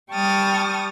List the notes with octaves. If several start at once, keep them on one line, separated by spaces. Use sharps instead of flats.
G3 G5 A5 C#6 D#6 F6